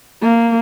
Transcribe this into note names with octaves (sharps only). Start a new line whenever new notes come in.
A#3